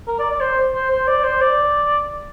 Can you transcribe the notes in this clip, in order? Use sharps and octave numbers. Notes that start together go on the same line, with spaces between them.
A#4
D5
D5
C5
C5
C5
D5
C5
D5